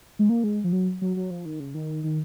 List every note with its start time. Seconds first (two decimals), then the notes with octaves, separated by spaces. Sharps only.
0.19 G#3
0.29 A#3
0.44 G#3
0.64 F3
0.72 F#3
1.01 F#3
1.16 F#3
1.30 F3
1.45 D#3
1.60 C#3
1.74 D#3
2.04 D#3